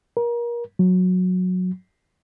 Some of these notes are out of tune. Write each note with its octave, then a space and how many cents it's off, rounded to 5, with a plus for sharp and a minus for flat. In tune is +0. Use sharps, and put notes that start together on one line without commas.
A#4 +30
F#3 -15